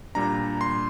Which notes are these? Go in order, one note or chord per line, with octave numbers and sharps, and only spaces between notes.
A#2 G3 D4 A#5
C6